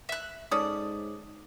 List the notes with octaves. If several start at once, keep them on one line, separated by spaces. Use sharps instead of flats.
E5 F#6
G#2 C#4 A4 D5 D#6